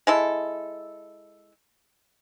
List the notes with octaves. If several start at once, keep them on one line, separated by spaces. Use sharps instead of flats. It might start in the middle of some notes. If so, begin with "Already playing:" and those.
G#3 E4 A4